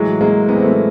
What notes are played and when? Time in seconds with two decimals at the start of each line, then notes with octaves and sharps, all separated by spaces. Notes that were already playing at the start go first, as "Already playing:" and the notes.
Already playing: A2 E3 F#3 G#3
0.21 G#3 A#3
0.48 A2 E3 B3
0.56 C4
0.63 A3 B3